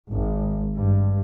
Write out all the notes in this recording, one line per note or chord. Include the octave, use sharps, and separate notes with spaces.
G#1
G2